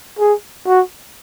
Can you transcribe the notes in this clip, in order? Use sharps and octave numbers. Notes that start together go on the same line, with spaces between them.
G#4
F#4